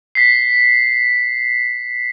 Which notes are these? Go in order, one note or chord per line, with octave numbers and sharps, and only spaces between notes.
B6 C7